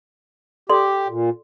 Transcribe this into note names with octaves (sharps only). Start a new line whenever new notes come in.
G4 A4 D5 C6
A#2